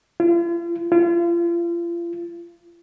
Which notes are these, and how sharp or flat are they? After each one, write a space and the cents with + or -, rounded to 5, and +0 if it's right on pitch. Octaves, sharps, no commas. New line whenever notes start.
F4 -40
F4 -35